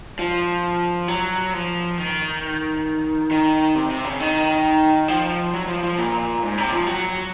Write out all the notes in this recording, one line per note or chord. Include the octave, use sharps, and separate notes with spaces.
F3
F#3
F3
D#3
D#3
C3
C3
C#3
D#3
F3
F#3
F3
F3
A#2
G#2
C3
F3
F#3